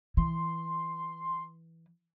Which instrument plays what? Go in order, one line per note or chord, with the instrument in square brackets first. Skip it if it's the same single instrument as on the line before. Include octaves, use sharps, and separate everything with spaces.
[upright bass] E3 [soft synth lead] C6